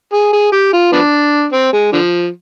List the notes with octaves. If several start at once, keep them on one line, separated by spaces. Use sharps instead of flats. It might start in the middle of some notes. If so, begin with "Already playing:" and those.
G#4
G#4
G4
F4
F3 B3 D4
C4
G#3
D3 F3